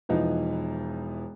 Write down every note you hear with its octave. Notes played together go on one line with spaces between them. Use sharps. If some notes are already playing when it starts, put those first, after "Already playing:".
E1 E3 F3 D#4